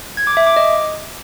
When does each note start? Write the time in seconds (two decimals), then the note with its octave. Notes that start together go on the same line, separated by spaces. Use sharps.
0.17 G#6
0.27 D6
0.37 E5
0.47 D6
0.56 D#5